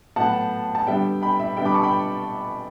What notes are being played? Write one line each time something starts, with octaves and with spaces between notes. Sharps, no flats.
A2 F#3 B3 F#5 A5
A5
D3 G3 B3 E5 G5
G5 B5
E5
D3 G3 B3 E5 G5
B5 D6
A5 C#6
G5 B5